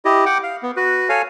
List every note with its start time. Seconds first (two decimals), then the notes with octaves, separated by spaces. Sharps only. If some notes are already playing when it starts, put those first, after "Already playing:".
0.05 E4 G4 D#5
0.26 F#5 G5 D6
0.43 F5
0.63 B3
0.76 F#4 B4
1.09 A4 C#5 F5 G#5